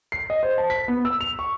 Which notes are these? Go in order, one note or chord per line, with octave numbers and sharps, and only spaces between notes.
C7
D#5
C5
A5
B6
B3
E6
F7
C#6